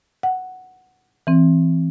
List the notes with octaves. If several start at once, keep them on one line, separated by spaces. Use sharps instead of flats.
F#5
E3 C4